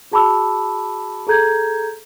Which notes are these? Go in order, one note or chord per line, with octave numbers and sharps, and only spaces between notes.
F#4 G#4 A5 B5 D6 E6
G#4 A4 A#5 G6 G#6